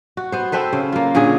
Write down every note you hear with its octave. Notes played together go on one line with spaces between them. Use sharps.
F#4
B3 C5
C4 A4 B4 C5
C#3
A#3 F4
A#2 D3 C#4 G#4